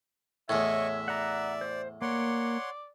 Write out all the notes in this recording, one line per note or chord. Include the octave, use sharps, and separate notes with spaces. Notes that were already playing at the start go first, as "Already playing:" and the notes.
E2 A2 C#5 D#5 E5 C#6
D5 F#5 A#5
C5
A#3 C#5 D5 F#5 C6